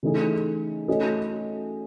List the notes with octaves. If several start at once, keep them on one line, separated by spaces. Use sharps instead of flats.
C#3 E3 A3 D#4 G#4
A3 C#4 F#4 A4 D#5